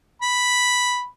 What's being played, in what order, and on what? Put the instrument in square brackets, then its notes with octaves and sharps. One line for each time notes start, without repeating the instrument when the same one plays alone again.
[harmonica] B5